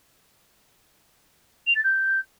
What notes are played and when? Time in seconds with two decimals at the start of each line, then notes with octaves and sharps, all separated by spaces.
1.67 F7
1.75 A6
1.84 G6